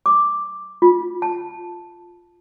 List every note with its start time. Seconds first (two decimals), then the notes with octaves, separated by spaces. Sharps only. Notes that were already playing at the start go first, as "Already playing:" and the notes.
0.06 D6
0.82 F4
1.22 A5